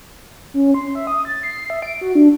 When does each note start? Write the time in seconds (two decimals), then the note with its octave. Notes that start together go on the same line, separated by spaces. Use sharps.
0.54 C#4
0.74 C6
0.95 E5
1.07 D#6
1.25 A6
1.43 C7
1.70 E5
1.82 D7
2.01 F#4
2.15 D4